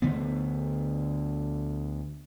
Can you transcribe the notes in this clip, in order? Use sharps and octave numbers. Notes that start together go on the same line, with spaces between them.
D2 D3 A3 B3